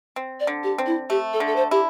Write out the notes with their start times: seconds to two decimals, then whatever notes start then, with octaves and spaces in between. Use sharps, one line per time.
0.16 C4
0.40 D5
0.47 D3
0.63 G4
0.78 C4
0.86 E4
1.10 A3 G4
1.33 A4
1.40 D3
1.47 A4
1.56 C5
1.71 E4 G4